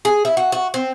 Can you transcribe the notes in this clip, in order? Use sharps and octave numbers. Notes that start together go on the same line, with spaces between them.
G#4
E4
F#4
F#4
C4